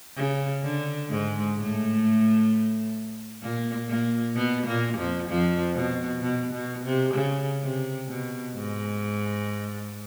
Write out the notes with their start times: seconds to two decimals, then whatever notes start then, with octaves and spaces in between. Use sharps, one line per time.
0.17 C#3
0.64 D3
1.10 G#2 G#3
1.57 A2 A3
3.43 A#2 A#3
3.89 A#2 A#3
4.35 B2 B3
4.66 A#2 A#3
4.98 F2 F3
5.29 F2 F3
5.75 B2
6.22 B2
6.53 B2
6.84 C3
7.15 C#3
7.61 C3
8.08 B2
8.55 G#2